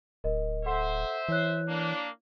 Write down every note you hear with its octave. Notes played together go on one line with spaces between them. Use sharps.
D1 A#4 D#5
A4 C5 E5 F#5 C6
E3 E4 C#5 F#6
A#3 D4